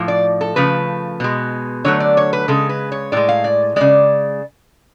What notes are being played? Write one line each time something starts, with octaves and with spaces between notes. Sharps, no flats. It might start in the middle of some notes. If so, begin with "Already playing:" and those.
Already playing: A2 F3
D5
A4
C#3 F3 A3 B4
B2 G#3
D3 F#3 A3 C#5
D5
C#5
B4
C#3 G#3 A4
B4
C#5
A2 G#3 D5
F5
D5
C#3 G#3 D5